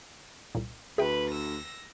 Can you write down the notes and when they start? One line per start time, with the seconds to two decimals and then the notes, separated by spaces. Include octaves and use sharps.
0.55 C2 A#2
0.98 D2 G#4 B4 E5 G5 B5
1.30 E6 A#6